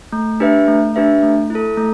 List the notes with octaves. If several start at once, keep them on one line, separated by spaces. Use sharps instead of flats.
A3
D4 G4 B4 E5
A3
D4 G4 B4 E5
A3
E4
A4
A3